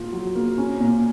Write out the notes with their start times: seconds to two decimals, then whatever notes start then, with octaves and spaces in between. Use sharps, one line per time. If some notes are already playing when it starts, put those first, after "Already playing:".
Already playing: A#2 A#3 F4
0.12 F#3
0.35 A#3
0.58 C#4
0.80 A#2